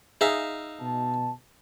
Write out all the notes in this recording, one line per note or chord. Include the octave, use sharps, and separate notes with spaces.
D#4 G#4 E5 F5
B2 A5